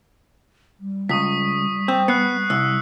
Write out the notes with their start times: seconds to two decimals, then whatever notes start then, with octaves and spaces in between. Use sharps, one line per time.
0.80 G3
1.09 C#2 C#6 D#6 B6
1.88 C4
2.08 B3 F#6 C7 C#7
2.50 C2 E6